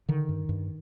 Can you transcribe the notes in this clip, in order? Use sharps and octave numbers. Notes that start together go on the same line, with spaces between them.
D3 D#3
G2
G2